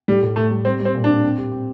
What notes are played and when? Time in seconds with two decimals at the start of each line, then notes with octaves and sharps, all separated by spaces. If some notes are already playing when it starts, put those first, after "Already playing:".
0.08 A2 G3
0.23 A2
0.36 A2 A3
0.50 G3
0.65 G3 C4
0.80 G3
0.85 C4
0.95 A#2
1.04 C4 D4
1.23 C4
1.38 G4
1.52 C4